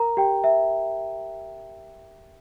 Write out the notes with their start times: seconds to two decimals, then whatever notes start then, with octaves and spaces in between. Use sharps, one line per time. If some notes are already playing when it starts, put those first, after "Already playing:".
Already playing: A#4 A#5
0.17 G4 G5
0.44 E5